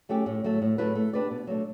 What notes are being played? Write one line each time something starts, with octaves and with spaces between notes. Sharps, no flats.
F#3 A3 C#4 G4
A2
F#3 A3
A2
F#3 A3 E4 B4
A3
D4 G4 B4 D5
B2
F#3 A3 D4